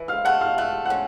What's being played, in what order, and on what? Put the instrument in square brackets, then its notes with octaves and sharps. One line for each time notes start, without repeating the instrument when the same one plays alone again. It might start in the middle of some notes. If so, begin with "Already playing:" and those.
Already playing: [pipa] E3
[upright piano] F5 F6
[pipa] A3 [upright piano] F#5 F#6
[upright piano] F5 F6
[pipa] A3 [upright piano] F#6
[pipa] C#4 [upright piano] F#5 F#6